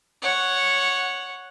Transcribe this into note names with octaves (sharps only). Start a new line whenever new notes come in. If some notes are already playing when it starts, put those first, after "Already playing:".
C#5 F#5